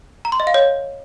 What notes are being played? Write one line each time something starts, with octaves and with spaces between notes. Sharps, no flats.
A#5
C6
D#5
F5
C#5